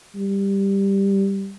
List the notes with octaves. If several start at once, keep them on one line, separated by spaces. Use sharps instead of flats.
G3